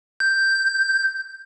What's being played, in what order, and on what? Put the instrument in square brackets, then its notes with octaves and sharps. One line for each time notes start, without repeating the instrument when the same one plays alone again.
[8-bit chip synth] G6